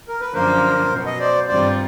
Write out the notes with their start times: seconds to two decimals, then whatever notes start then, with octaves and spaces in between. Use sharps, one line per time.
0.08 A#4
0.21 B4
0.34 F#2 D3 F3 A#3 A#4 C5
0.90 B2 F#3 B3
1.06 D#5
1.20 C5 D5
1.47 G2 D#3 G3 C4 F4 C5 D5